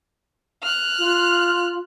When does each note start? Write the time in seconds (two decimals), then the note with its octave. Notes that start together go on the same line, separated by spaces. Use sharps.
0.63 F6 F#6
0.98 F4